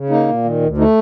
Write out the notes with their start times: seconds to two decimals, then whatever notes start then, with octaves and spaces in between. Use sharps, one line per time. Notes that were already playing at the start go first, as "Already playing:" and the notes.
Already playing: C#3
0.10 A#3 D#4
0.27 A#2
0.44 D#3
0.61 D2
0.77 A3 D#4